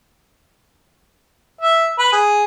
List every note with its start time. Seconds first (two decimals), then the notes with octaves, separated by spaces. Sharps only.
1.61 E5
1.99 B4
2.12 G#4